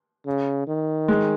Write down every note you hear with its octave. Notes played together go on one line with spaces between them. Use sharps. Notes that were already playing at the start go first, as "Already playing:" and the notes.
C#3
D#3
G#3